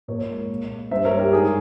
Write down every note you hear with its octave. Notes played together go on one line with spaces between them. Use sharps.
A#2 A#4 C#5
G#3
A#3
A#3
G2 C5 E5
A#4 C#5
G2
G4 A#4
G#2 G#4